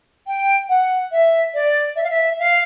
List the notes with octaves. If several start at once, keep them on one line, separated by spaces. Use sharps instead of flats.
G5
F#5
E5
D5
E5
F5
E5
F5